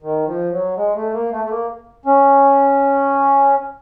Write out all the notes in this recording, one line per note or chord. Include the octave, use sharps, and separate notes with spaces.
D#3
F3
F#3
G#3
A3
A#3
A3
A3
A#3
C#4